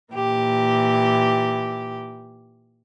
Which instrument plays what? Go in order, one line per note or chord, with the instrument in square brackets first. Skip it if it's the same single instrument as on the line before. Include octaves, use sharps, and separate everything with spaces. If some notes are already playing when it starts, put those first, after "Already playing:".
[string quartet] A#2 E3 G4